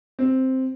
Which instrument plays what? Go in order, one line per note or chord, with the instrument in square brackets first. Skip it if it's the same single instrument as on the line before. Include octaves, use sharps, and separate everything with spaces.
[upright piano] C4